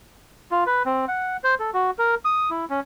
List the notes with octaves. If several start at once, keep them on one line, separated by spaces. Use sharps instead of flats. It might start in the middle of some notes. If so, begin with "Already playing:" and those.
F4
B4
C4
F#5
C5
A4
F#4
A#4
D#6
E4
C#4